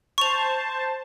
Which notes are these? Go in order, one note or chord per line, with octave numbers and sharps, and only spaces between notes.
C5 A5 C#6 F7